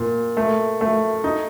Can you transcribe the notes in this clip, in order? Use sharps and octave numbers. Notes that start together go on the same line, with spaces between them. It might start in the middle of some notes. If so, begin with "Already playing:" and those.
Already playing: A#2
A3
A3
D#4